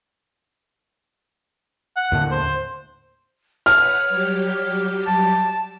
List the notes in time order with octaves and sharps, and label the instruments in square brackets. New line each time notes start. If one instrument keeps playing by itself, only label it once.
[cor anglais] F#5
[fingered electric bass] D#2 A2 D3
[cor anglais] C5
[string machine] B4 F#5 [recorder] C#5 [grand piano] F6
[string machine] F#3 G3 G4
[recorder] A5